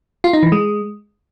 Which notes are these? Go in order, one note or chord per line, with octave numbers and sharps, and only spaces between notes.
F4
D#4
E3
G#3